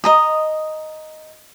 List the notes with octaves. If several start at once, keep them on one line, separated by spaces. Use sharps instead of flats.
D#5 A#5 D#6